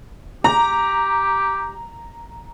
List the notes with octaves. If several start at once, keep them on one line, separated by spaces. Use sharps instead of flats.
G4 A#5